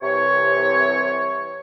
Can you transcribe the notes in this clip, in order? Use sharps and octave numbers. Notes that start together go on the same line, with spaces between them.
C2 C3 E3 C#5